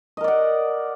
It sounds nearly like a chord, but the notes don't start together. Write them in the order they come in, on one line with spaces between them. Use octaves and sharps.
D#5 A#4 D5 F#5